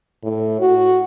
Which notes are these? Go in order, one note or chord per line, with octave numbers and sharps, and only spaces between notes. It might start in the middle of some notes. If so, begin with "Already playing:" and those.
A2
F#4